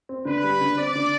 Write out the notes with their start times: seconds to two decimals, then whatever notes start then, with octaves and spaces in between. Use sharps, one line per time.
0.09 C4
0.25 D3 B4
0.43 G3
0.61 D3
0.78 C4 D5
0.95 D3